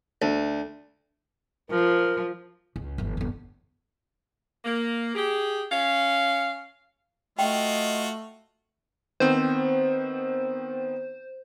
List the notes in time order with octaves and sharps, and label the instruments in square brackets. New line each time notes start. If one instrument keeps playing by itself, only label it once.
[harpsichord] D2
[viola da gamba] F3 [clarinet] A#4
[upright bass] C#2
G1 E3
G1 F2
[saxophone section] A#3
G4 G#4
C#4 F5
[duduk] A3 [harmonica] F4 F#4 [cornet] D#5 [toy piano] G5
[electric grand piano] D#3 B3 C4 [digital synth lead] C5